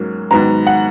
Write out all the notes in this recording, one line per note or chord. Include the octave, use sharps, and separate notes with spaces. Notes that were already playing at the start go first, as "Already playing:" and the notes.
Already playing: G#2 F#3 A#3 C#4
G#2 D#3 F#3 B3 A#5
F#5